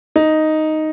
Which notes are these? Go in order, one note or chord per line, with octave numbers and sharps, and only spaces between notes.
D#4